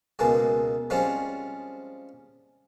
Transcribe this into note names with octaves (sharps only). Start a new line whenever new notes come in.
C#2 B2 G#3 A#3 A5
F3 G3 G#3 C4 C#4